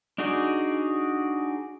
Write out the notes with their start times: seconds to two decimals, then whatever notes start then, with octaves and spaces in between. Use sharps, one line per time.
0.18 D4 D#4 F#4 G#4 D5